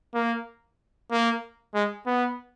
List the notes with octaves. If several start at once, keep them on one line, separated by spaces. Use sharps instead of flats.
A#3
A#3
G#3
B3